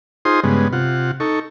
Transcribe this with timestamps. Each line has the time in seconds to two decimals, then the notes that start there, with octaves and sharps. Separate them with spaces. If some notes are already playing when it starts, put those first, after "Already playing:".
0.25 D#4 F4 G#4 C5 C6 D#6
0.44 G2 C#3 G#3 B3
0.73 C3 F4 F#5
1.20 D#4 A4 C#6